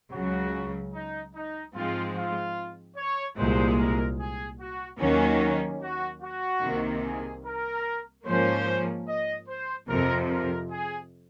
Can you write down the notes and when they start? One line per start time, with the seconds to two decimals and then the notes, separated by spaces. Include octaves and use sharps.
0.12 C#2 C#3 F#3 F#4
0.93 D#4
1.34 D#4
1.74 G#2 F3 G#3 C4 F4
2.15 F4
2.97 C#5
3.37 C2 A#2 G#3 C5
3.78 A#4
4.19 G#4
4.59 F#4
5.00 D#2 D#3 F#3 A#3 C#4 F#4
5.81 F#4
6.22 F#4
6.63 C2 C3 D#3 A#3
7.04 G#4
7.44 A#4
8.26 G#2 F3 A#3 C#4 C5
9.07 D#5
9.47 C5
9.88 F2 C3 F3 A#4
10.29 A#4
10.70 G#4